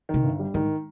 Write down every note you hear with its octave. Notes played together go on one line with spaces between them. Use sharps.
C3 D#3
G1
G3
G#2 D#3